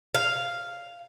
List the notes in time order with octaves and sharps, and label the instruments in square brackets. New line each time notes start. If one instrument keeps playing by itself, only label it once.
[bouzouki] F5